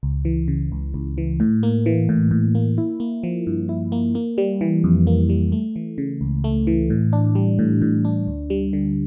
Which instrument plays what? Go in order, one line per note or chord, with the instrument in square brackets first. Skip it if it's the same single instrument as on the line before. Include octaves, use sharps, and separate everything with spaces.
[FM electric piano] C#2
E3
C#3
C#2
C#2
E3
A2
A#3
E3
A2
A2
A#3
E4
A#3
F3
G2
E4
A#3
A#3
G3
E3
F2
A#3
G3
A3
E3
C#3
C#2
A3
E3
A2
D4
G3
A2
A2
D4
D2
G3
D3